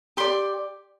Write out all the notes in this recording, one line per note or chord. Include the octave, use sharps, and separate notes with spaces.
G4 D5 C6